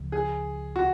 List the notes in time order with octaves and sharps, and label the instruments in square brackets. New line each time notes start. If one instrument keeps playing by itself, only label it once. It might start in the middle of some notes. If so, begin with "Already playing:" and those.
Already playing: [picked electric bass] C#2 C#3 F3
[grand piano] G#4
F#4